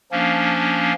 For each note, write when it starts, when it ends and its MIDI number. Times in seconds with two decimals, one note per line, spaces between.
0.12 0.93 53
0.12 0.93 58
0.12 0.93 61
0.12 0.93 62